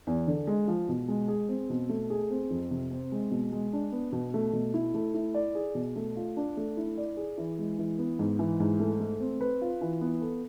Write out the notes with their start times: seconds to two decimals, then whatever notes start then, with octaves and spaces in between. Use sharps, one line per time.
0.07 E2
0.27 D3
0.47 G#3
0.68 F3
0.89 B2
1.08 G#3
1.28 G#4
1.49 C4
1.70 B2
1.89 A3
2.10 G#4
2.31 C4
2.50 F2
2.71 C3
2.91 C4
3.12 G#3
3.31 B2
3.52 G#3
3.73 D4
3.92 B3
4.12 B2
4.34 A3
4.53 B2
4.74 E4
4.94 A3
5.14 E4
5.34 D5
5.55 G#4
5.75 B2
5.96 A3
6.17 F4
6.37 D4
6.57 A3
6.77 E4
6.97 D5
7.17 G#4
7.38 E3
7.59 G#3
7.78 E3
7.99 B3
8.19 G#2
8.39 E3
8.60 G#2
8.80 A3
9.00 A3
9.20 C4
9.41 B4
9.62 F4
9.81 E3
10.01 B3
10.21 A4